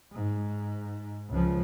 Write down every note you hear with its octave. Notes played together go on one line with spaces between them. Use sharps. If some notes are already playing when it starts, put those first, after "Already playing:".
G#2
C#2 F3